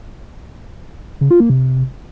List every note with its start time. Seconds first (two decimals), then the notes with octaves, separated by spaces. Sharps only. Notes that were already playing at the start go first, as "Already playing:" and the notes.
1.21 C#3
1.31 F4
1.40 A#3
1.50 C3